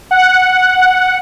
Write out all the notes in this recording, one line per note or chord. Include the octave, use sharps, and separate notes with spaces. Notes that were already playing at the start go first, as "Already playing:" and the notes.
F#5